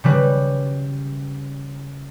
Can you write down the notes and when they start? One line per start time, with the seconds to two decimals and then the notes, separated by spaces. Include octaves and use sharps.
0.04 C#3 G3 B4